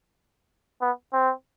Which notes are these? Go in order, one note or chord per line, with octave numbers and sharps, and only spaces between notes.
B3
C4